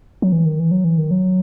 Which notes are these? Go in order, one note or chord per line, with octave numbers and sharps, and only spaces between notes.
F#3
E3
D#3
E3
F#3
E3
D#3
F#3